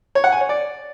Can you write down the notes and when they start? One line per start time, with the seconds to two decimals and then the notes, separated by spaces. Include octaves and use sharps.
0.15 C#5
0.24 F#5
0.32 G#5
0.41 C#5
0.49 D5